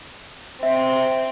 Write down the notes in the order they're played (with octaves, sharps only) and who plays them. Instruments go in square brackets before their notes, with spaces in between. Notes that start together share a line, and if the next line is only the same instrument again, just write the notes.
[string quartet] C4 [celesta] E5